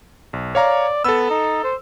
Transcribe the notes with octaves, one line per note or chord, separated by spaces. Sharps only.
B1
C#5 D5 F5 A#5
B3 A4 E6
D#4
C5